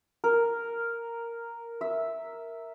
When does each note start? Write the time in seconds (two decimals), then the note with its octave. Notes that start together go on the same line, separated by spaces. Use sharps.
0.24 A#4
1.81 E5